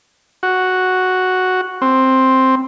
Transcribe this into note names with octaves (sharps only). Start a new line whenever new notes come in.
F#4
C4